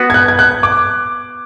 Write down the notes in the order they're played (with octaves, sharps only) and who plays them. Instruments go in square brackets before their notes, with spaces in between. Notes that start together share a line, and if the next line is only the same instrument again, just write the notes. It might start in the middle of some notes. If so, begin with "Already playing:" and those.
Already playing: [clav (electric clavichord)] B3 F#4 B4
[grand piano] G#6
F#6
G#6
F#6
D6